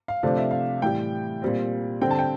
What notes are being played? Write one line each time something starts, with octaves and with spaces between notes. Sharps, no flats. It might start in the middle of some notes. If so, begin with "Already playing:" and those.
F5
C3 F3 A3 D4 F5
E5
F5
A2 E3 G3 G5
A#2 G3 C4
D3 G3 C4 G5
A5
G5